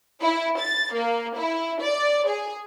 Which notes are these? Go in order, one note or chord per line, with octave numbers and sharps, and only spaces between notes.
E4
A6
A#3
E4
D5
G#4